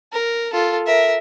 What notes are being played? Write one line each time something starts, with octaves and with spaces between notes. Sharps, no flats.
A#4
F4 A4
A#4 E5